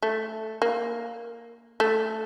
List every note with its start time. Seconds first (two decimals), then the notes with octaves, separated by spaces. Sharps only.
0.03 A3
0.62 A#3
1.80 A3